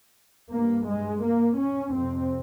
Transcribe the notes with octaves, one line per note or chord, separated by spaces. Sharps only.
G2 A#3
G#3
A#3
C#4
F2 C3 C4